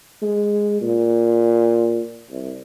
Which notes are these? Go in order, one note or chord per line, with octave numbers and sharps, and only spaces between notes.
G#3
A#2
C2